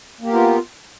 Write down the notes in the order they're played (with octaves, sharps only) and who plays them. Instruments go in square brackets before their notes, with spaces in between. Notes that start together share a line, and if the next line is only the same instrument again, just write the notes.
[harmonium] A#3
G4
A#4
B3
F4